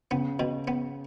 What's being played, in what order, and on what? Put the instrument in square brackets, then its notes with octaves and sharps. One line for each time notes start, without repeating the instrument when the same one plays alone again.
[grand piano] C#3 [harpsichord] B3
[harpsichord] B2
B3